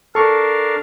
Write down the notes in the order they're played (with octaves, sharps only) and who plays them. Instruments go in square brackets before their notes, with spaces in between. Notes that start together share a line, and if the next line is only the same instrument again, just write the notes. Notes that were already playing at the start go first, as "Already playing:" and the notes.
[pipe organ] D4 A#4 F5 [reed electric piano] A4 C#6